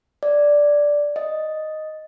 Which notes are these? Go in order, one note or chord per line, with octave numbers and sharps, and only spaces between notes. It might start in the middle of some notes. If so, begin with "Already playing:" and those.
D5
D#5